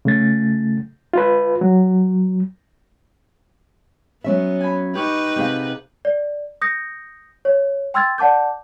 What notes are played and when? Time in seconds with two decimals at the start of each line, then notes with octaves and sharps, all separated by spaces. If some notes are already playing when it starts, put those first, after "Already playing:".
0.05 C#3 A3 A6
1.14 F4 B4
1.61 F#3
4.24 F#3 B3 C#4 E5
4.61 G#5 B5
4.95 D#4 G4 B4 C#6 F6
5.36 C3 B3 G4 G#4 F5
6.05 D5
6.62 D#6 G6 A#6 C#7
7.45 C#5
7.94 G5 C6 E6 F6 G#6 A6
8.18 D5 F#5 A5 D6 G6